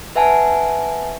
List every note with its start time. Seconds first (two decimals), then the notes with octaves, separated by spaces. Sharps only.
0.15 B4 E5 F#5 G#5 A5